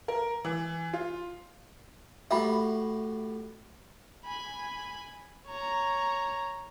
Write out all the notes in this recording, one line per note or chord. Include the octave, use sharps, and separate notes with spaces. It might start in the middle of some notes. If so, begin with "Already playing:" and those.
A#4
E3
F4
A2 F#4 G4 E5 G5 B5
G#5 B5
C#5 A#5